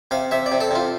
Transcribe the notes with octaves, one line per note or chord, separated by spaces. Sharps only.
C3 F5
C3 E5
D5
C3
A4
C3 F4